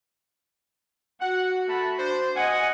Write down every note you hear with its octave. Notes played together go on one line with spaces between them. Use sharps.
F#4 F#5
A3 A5 B5
D4 C5
D#5 F#5 G#5